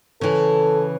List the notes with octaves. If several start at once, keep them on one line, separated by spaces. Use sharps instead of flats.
C#3 E3 A4